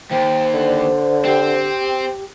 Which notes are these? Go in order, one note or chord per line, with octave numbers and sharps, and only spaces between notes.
D#2 C5 G5
D3
D5
C4 G4